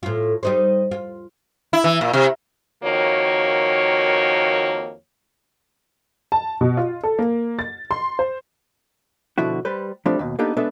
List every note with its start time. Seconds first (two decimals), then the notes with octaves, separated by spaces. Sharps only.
0.03 A2 F4
0.43 G3 D#4 C5
0.91 F4
1.73 E4
1.84 E3
2.01 A#2
2.13 C3
2.84 F2 D#3 A#3 F#4 C#5
6.32 A5
6.61 B2
6.77 F4
7.04 A4
7.19 A#3
7.59 A6
7.91 C6
8.19 C5
9.38 B2 D3 F3 E4 F#4
9.65 G3 B4 C5
10.06 F3 G3 A3 C4 D4
10.19 D#2 B2
10.39 A#3 B3 D4 D#4 G4 A4
10.56 G#3 B3 D4 A4 B4 E5